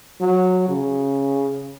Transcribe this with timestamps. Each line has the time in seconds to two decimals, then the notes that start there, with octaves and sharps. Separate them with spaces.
0.21 F#3
0.68 C#3